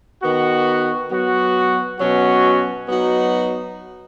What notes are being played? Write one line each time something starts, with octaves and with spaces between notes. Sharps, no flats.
D#3 B3 F#4
F#3 B3 F#4
B2 F#3 C#4 F#4
F#3 B3 D#4 F#4